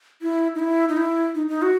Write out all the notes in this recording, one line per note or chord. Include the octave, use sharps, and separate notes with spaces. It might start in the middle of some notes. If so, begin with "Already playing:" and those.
E4
D#4
E4
D#4
E4
D#4
D#4
F#4